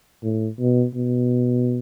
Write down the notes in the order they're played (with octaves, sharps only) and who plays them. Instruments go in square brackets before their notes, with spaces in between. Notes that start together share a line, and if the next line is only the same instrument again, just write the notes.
[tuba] A2
B2
B2